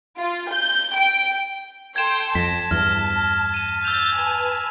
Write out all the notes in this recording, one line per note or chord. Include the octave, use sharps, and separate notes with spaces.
F4
G6
G5
A4 G5 C6 G#6 E7
F2 A5 A#6 B6
E2 G2 F6
D#7 E7
E6 G6 A6 F7
B4 G#5 A5